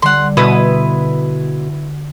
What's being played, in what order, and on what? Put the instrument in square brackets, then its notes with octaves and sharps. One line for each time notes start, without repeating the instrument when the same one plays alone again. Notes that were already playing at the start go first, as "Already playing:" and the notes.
[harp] D3 G3 [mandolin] F#5 C6
[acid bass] B2 [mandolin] E4 B4 D#6 [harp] F#4 C6 E7